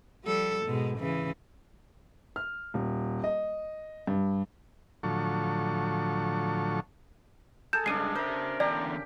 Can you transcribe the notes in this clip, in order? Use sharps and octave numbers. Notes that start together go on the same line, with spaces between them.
F3 G3 A4
G#2 B2 G#3
C#3 E3
F6
D#1
D#5
G2
A2 D3 F3 F#3 A4 C#6
G#4 A4 G6 E7
G2 C#3 G#3 D4 C7 D#7
A#4 C5 E5
E2 D3 G4 D5 A#5